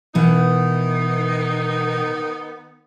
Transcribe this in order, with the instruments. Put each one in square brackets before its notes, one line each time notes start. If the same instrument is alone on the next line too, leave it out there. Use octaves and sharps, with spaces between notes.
[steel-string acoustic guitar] B2 E3 F#5 [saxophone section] D#3 B3 D#4